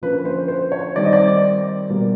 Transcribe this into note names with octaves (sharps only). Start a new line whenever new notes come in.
D3 F3 A#3 C#4 B4
C5
C5
C#5
D#3 G3 C4 D5
D#5
D5
B2 G3 A#3